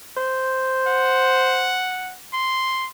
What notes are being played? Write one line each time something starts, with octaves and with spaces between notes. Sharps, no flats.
C5
F#5
C6